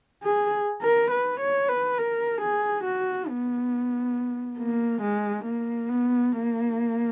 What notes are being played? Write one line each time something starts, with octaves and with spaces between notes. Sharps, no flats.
G#4
A#4
B4
C#5
B4
A#4
G#4
F#4
B3
A#3
G#3
A#3
B3
A#3